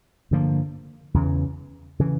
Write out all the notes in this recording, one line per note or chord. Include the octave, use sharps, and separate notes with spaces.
G2 D3 F3 A#3
E2 C#3 E3
C#3 E3